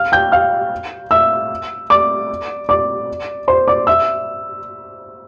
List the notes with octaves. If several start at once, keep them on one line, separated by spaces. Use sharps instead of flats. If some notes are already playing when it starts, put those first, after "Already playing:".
Already playing: F5 F6
G5 G6
F5 F6
E5 E6
D5 D6
D5 D6
C5 C6
D5 D6
E5 E6